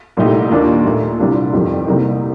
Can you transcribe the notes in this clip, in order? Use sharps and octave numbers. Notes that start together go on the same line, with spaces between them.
C2 A#2 A3 D#4 G4
D#2 D#3 A#3 D4 F4
A#2 A3 D#4
C2 C3 G3 D4 F4
G1 F2 D#3 G3
C2 C3 G3 A#3 D#4